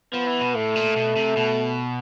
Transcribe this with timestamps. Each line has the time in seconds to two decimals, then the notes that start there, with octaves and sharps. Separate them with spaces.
0.13 F3 B3
0.27 E3
0.41 B2
0.55 A2 A3
0.75 A#2
0.96 B2
1.16 C3
1.36 B2